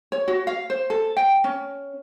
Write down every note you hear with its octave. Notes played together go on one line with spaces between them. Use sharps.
C#5
F#4
F5
C5
A4
G5
C#4